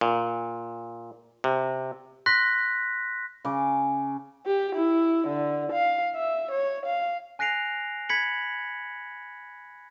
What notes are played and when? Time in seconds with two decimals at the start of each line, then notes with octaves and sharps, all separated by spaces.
0.01 A#2
1.44 C3
2.26 C6 F#6 A#6 B6
3.45 C#3 D6
4.46 G4
4.75 E4
5.27 D3
5.72 F5
6.16 E5
6.51 C#5
6.86 F5
7.39 G#5 F#6 A#6 C7 D7 F7
8.09 B5 G#6 B6 C#7 F#7